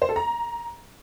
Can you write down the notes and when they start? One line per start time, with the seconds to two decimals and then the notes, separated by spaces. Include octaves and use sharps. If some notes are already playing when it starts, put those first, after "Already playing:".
0.02 C5
0.09 A4
0.16 A#5